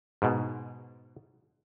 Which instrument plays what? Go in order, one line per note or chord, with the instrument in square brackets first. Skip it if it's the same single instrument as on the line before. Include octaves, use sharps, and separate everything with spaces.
[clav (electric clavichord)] G#2 B2